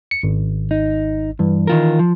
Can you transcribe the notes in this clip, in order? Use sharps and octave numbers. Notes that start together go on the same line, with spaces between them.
C#7
G#1
D#4
G2 E3
D#3 F4 A#4
F3